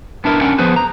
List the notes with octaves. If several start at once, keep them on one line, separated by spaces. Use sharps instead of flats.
B3 D4 E4 A#4
C#4 D4 A#4 F#5 G5
F3 B3 G#4 B4 C5
A#5